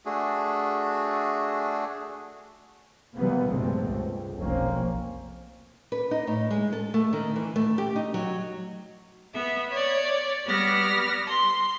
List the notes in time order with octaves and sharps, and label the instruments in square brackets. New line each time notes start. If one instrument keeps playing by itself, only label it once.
[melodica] A3 D4 F#4 G#4
[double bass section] C3 E3 F#3 G3 A#3 B3
A#1 G2 C3 G#3 A3 C4
C#2
F1 B1 F2 A#3 C4 C#4
[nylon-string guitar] B4
D#4
A2
G#3
A4
A3
D#3
E3
A3
G4
D#4
F#3
[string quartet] B3 E5
C#5 D5
G3 B3 B4 D6 F6 A#6
C6